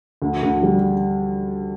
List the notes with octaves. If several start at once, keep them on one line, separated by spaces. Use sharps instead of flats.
D2
D2
G3